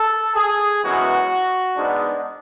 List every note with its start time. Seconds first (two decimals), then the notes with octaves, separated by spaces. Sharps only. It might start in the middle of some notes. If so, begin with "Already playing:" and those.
Already playing: A4
0.36 G#4
0.83 F#2 E3 G#3 B3 F#4
1.76 G#2 G#3 B3 D4